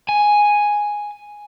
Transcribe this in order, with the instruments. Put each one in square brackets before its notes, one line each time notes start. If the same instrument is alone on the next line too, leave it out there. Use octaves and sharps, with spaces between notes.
[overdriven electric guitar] G#5